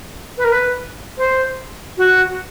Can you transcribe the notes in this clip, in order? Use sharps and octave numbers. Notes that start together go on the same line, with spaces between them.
B4
A#4
B4
C5
F#4